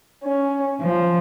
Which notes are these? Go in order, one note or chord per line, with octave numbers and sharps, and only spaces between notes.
C#4
F3